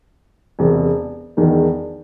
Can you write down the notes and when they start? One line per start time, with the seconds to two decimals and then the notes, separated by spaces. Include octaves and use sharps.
0.59 E1 E2 C3
1.37 E1 E2 D#3